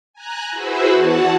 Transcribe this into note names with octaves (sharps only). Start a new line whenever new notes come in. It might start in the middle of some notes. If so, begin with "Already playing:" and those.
G#5 A#5 F#6
E4 F#4 G#4 B4 C5 E5
E2 E3 F#4 F#5 A5